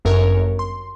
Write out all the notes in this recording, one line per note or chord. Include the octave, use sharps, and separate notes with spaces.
G1 F#2 A#4 C#5
C6